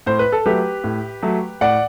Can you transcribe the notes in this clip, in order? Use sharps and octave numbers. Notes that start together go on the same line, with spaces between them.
A2 C5
B4
A4
F#3 A3 G4 B4
A2
F#3 A3
A2 D5 F#5